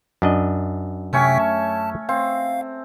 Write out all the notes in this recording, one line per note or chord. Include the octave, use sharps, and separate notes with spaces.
F#2 D4 D#5
C3 A3 C#4 C#5 G5 B6
A5
C4 F5